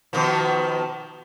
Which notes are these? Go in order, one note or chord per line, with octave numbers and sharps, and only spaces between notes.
B2 D#3 F3